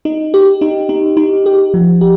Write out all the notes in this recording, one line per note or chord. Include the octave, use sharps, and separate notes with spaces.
D#4
G4
D#4
D#4
D#4
G4
F3
G4